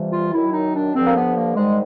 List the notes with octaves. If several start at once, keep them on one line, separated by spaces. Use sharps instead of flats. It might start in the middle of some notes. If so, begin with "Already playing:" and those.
Already playing: F2 C3 E3 G3
F4
F#2 D#3 F#3 E4
D#4
D4
G2 D3 F3 C4
A#3
B3
A#3
G#2 D#3 G3 G#3